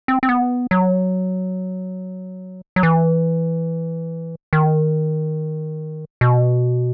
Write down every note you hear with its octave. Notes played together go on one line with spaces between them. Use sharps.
C4
C4
B3
F#3
F#3
E3
D#3
B2